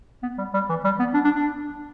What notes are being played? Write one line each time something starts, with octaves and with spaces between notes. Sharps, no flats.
B3
G3
G3
E3
G3
B3
D4
D4
D4